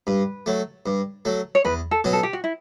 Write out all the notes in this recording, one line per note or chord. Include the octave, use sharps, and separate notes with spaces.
G2 B4
F#3 A3
G2
F#3 A3
C#5
E2 B4
A4
B2 F#3 C#4
A4
G4
F#4
E4